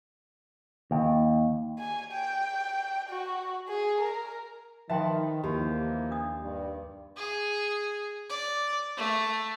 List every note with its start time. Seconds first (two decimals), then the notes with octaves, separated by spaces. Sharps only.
0.91 D#2
1.79 G#5
2.12 G5
3.10 F#4
3.69 G#4
4.01 A#4
4.89 D#3 F3 B4 E5 G5 A5 C6
5.43 D#2 E3 F3 A#3 G4
6.11 D4 D#6
6.43 G2
7.17 G#4
8.30 D5
8.97 A3